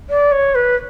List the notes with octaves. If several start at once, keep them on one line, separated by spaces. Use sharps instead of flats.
D5
C#5
B4